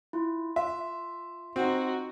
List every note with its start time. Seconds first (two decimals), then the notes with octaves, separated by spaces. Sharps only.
0.13 E4 F4
0.56 F4 E5
1.56 C4 D#4 F#4